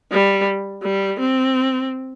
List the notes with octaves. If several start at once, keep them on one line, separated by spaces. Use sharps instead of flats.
G3
G3
C4